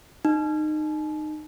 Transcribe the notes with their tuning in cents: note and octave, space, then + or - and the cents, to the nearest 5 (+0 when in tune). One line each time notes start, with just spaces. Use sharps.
D#4 -20